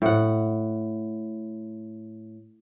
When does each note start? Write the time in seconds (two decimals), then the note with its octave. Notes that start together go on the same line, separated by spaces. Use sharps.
0.02 A2 F#5